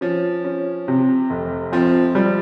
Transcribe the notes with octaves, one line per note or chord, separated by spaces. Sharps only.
F3 C#4
C#4
C3
F1
F3 C4
F3 G3